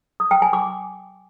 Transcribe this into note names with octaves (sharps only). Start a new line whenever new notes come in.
D#6
G5
G#5
D6